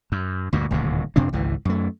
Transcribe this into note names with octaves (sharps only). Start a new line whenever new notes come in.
F#2
D2 G2 A#2
D#1 D2 A2 C3
F2 C3 C4 D4
G#1 C#2 E3
F#2 A3